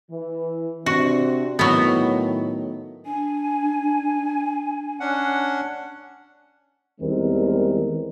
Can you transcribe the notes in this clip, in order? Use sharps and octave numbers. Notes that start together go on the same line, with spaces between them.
E3
C3 C4 D4 F#4
A2 D#3 F#3 B3
D4 G#5
C#4 D4 F#5
E2 D#3 G3 G#3 C4 A#4